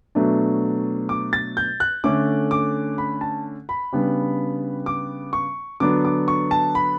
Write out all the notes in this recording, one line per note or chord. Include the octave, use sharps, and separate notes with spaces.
B2 F#3 A3 D4
D6
A6
G6
F#6
D3 A3 C#4 D6
D6
B5
A5
B5
C#3 G3 B3 D4
D6
C#6
D3 F#3 B3 D4 D6
D6
C#6
A5
B5